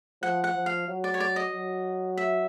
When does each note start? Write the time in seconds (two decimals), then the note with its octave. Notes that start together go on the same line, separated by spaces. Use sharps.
0.22 F3 F#5
0.44 F#5
0.55 F3
0.66 F5
0.88 F#3
1.04 D5
1.14 C#5
1.20 D5
1.36 D#5
1.53 F#3
2.17 E5